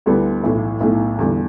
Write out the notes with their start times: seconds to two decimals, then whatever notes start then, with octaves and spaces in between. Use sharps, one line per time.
0.06 D2 D3 G3 B3 E4
0.44 B1 A2 E3
0.81 B1 A2 A3
1.18 E2 D3 G3